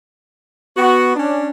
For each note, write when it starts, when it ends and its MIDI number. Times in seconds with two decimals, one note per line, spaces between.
0.77 1.16 59
0.77 1.16 66
1.16 1.50 61
1.16 1.50 62